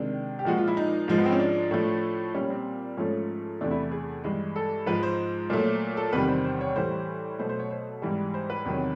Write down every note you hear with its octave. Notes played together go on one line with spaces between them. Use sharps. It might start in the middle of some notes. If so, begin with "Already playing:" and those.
Already playing: C3 D#3 G#3 D4
G4
A#2 F3 G#3 F#4
F4
E4
D#4
G#2 F3 G#3
B3
C4
C#4
D4
A2 F3 A3
A#2 G3 C#4
C4
G#2 F3 A3 C#4
E2 C3 E3 A3 D4
E4
G#4
G2 E3 G#3
A4
G#2 F3 G#3 B4
C5
A#2 F#3 A3
A4
E2 C3 D#3 G3 B4
C5
C5
C#5
A2 E3 G3 C5
B2 F#3 A3 C5
C5
C#5
C5
G#2 E3 G3
C5
B4
E2 C3 D#3 F#3